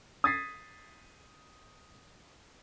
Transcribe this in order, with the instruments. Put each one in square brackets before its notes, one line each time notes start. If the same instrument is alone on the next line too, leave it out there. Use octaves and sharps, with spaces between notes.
[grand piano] D#6 G#6 A6 B6 C7